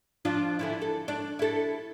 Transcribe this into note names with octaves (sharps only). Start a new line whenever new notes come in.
F3 D4 F4
D3 E3 E4
A4
D4
E4 A4